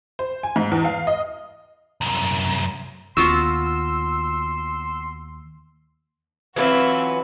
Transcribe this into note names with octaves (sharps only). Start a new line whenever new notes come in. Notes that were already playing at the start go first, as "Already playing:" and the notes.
C5
G#5
G#2
E2
F5
D#5
C2 F#2
D#2 B3 F4 F#4 C6 E6
E3 F#3 C4 F4 F#4 B4 E5